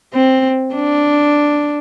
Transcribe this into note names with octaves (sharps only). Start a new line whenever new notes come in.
C4
D4